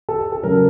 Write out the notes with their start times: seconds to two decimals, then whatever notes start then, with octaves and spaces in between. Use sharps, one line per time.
0.09 A4
0.32 A4
0.43 C#3 F#3 A#4